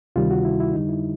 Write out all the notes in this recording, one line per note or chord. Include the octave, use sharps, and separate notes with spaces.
D2 C3 D#3 G3 F4
F#4
E4
E4
F2 D3 G3 D#4
E4